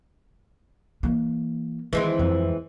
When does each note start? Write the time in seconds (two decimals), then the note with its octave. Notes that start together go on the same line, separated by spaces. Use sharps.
1.03 E3 A#3
1.93 D#3 E3 G#3 C4
2.19 F2